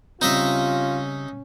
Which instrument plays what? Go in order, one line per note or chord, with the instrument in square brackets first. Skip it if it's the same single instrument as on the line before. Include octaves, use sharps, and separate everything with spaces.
[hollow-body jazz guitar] C#3 G3 C4 [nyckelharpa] C#4 [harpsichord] D#4 D#5 E5 [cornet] F4